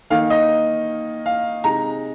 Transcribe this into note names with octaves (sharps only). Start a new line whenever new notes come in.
D#3 A#3 D#4 F5
D#5
F5
C3 G#3 D#4 A#5